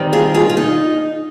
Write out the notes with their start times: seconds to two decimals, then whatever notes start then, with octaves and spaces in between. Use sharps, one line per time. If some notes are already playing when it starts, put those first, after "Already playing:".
Already playing: D#3 G3 C4
0.13 F4 G#4
0.34 F4 G#4
0.50 F4
0.57 D#4